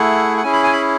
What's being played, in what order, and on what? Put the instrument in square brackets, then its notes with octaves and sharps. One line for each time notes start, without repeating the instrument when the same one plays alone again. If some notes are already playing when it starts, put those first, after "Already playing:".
Already playing: [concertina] A3 E4 G#4 F#5
F#5
C#4 E4 G#4 G#5
B5
G#5
B5